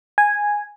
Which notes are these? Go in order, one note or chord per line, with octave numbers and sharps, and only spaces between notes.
G#5